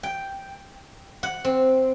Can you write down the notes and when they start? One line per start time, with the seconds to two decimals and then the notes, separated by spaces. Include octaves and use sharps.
0.03 G5
1.23 F#5
1.44 C4